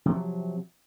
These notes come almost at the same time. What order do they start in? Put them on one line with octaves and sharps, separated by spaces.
C3 F3 F#3